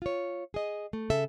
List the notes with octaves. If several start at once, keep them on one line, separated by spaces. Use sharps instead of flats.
F4 C#5
G#4 D#5
A3
C#3 A4 E5